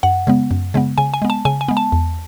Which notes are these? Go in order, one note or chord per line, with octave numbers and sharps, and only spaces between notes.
F#2 F#5
C#3 G#3 B3
F#2
C#3 G#3 B3
C#3 G#5
G#5
G#3 B3
A5
C#3 G#5
G#5
G#3 B3
A5
E2